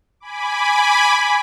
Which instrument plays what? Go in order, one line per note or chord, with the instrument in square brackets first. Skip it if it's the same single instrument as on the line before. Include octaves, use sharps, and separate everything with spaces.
[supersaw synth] G#5 B5 D6